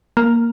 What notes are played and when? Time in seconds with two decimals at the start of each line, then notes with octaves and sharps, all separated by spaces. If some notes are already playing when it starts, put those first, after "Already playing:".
0.17 A#3